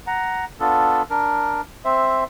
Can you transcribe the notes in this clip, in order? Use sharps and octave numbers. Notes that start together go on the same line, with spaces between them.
F#5 A#5
B3 D4 F4 A4
D4 A#4
C4 C5 E5